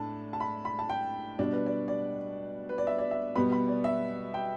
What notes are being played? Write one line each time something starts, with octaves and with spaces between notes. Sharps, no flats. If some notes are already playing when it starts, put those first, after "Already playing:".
Already playing: A2 A3 D4 A5
A5
B5
B5
A5
G5
B2 G3 D4 D5
B4
D5
D5
B4
D5
E5
D5
E5
B2 G3 B3 B5
B5
D5
E5
G5